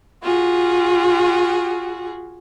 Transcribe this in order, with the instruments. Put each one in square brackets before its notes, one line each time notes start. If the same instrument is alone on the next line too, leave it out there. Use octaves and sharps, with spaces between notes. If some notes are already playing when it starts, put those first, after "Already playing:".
[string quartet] F4 F#4 G#4